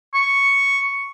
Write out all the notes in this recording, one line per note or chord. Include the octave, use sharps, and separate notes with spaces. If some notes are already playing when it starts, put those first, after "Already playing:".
C#6